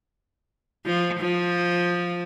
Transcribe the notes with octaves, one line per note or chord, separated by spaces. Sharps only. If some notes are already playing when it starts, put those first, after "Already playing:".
F3
F3